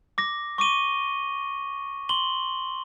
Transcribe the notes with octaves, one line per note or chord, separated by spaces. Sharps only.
D6 A#6
C#6 D6 D#7 G7
C6 F#7 G7